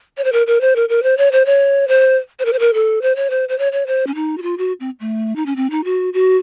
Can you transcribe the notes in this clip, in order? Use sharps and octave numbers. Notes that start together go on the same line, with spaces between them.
C#5
C5
A#4
A#4
C5
A#4
A#4
C5
C#5
C5
C#5
C5
C5
A#4
C5
A#4
A4
C5
C#5
C5
C5
C#5
C#5
C5
C#4
D#4
F#4
F4
F#4
C4
A3
D#4
C#4
C4
D#4
F#4
F#4